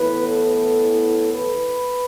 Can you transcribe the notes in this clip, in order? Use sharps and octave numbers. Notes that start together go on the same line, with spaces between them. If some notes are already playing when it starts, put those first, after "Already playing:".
Already playing: A2 E3 B3 B4
A4
B4